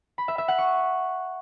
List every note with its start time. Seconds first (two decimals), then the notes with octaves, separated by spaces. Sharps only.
0.18 B5
0.28 E5
0.38 E5
0.48 F#5
0.58 C#6